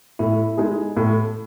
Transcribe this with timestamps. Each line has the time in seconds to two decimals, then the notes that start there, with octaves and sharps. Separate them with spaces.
0.19 A2 E4
0.57 G#3 D#4 G#4
0.97 A2